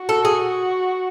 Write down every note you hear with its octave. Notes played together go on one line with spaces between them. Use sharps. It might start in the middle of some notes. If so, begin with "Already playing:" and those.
Already playing: F#4
A4
G#4